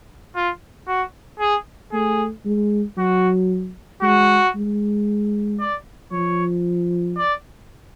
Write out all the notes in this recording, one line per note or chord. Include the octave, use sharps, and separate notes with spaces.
F4
F#4
G#4
A3 G#4
G#3
F#3 F#4
G#3 F#4
G#3
D5
F3 C#5
D5